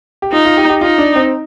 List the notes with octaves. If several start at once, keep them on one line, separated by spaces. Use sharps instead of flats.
G4
D#4 F4
F4
G4
G4
D#4 F4
D4
C4